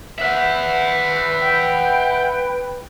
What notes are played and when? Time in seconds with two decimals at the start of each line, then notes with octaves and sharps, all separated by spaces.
0.19 B4 E5 F#5
1.40 G5